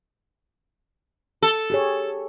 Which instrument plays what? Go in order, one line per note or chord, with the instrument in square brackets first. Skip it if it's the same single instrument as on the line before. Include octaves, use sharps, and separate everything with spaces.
[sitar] A4
[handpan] G4 G#4 C#5